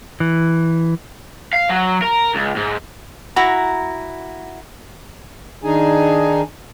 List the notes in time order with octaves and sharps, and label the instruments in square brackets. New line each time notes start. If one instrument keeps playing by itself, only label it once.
[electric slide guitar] E3
[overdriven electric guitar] F5
F#3
A#4
C#2
G#2
[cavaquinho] E4 F#4 A#5
[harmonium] D#3 D4 D#4 G#4 G#5